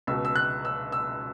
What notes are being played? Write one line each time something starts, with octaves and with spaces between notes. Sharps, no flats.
C#2 B2 E6
E6
F#6
E6
E6